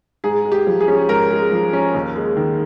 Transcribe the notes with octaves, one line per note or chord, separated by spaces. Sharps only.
G#2 G#4
G#3
G4
F3
G#4
C#4
G#2 A#4
G#3
F3
C#4
D#2
G#3
D#3